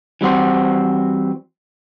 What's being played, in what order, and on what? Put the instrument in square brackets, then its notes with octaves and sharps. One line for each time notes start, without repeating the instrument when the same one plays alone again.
[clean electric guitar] E3 G3 C4 F#4 C5